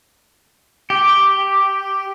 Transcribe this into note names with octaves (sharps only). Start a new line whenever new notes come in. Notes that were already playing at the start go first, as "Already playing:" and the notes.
G4